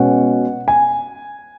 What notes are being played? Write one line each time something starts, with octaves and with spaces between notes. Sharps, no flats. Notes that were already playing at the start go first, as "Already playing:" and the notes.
Already playing: B2 G#3 C#4 F#5
G#5